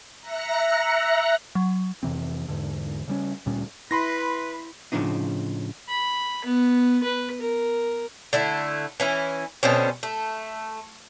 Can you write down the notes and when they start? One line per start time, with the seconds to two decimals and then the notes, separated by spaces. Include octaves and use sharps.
0.20 E5 A#5 F#6 A#6 C#7
1.55 F#3
2.03 F2 C3 E3 C4
2.48 E2 G#2 D3
3.08 C#3 G3 C#4
3.46 D2 A#2 G3 C#4
3.91 E4 B4 B5 C6 A#6
4.92 A2 C#3 F3 D4 D#4
5.88 B5
6.45 B3
7.04 B4
7.41 A#4
8.33 D3 A3 E4
9.00 E3 C#4 E4
9.63 B2 D3 C4 C#4
10.03 A3